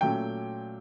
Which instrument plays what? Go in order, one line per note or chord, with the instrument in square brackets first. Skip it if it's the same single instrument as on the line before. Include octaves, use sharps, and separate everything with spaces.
[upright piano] A#2 F#3 A3 C#4 G5